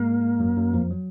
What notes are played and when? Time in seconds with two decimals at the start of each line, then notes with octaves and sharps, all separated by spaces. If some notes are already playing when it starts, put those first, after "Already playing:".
Already playing: G#2 G#3 A#3
0.40 F#2 F#3
0.57 F#2 F#3
0.74 F2 F3
0.91 F#3